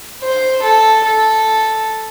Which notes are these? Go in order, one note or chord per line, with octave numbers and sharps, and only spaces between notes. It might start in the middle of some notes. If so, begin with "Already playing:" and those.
C5
A4
A4